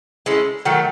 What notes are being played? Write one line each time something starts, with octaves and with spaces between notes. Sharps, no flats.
G#3 C#4 E4 A4
D#3 F#3 A3